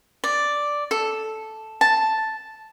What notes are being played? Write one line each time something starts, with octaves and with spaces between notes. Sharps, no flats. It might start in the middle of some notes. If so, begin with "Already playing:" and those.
D5
A4
A5